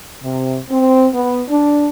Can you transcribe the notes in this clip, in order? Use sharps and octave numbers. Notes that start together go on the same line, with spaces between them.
C3
C4
B3
D4